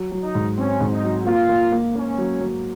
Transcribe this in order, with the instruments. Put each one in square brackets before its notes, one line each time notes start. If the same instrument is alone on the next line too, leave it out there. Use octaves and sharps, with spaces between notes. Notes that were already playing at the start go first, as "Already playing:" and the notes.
Already playing: [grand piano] F#3
F#3
[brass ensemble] D#4
[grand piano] G#2
[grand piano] C4 [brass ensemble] C#4
[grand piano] G#2
[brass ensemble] D#4
[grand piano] F#3
[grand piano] A#3 [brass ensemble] F4
[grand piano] A#3
A#3
[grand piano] A#3 [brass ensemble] C#4
[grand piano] F#3
F#3